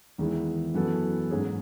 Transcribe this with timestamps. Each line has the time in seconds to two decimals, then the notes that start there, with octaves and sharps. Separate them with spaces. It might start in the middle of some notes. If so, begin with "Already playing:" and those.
0.18 E2 D#3 G#3 B3 E4
0.74 F#2 E3 B3 F#4 A4
1.30 G#2 F#3 C#4 G#4